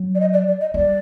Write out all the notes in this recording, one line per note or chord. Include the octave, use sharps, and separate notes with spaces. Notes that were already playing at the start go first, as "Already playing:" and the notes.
Already playing: F#3
D5
D#5
D5
D5
D#5
G3 D5